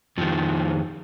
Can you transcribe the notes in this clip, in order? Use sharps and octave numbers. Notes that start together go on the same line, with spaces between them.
F2 D#3 F3